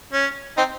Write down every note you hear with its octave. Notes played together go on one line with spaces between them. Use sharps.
C#4
C4 D#4